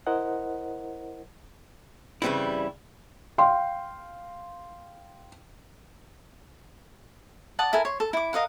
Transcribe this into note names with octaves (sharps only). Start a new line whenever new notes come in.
E4 A#4 C5 D#5 F#5
G2 C#3 E3 G3 C4 E4
F5 G5 C6
D5 F#5 A5 D#6
E4 A4 A#4 G#5
C#5 C6
A4
E4 D6
A#4 D#5 F5 F#5